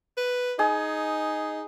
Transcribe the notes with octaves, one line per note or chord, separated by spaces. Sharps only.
B4
D#4 G#4